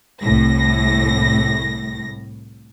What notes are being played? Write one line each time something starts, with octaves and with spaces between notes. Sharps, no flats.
C2 A2 A#6